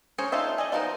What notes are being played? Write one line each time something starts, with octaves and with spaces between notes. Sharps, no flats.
C#4 G#4 A#4 C5 C#5
D#4 F4 A4 C5 E5
G#4 D5 D#5
F3 B3 D#4 A4 A#4